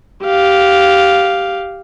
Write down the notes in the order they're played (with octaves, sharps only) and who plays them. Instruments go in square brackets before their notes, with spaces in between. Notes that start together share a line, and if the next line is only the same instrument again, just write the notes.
[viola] G4 F5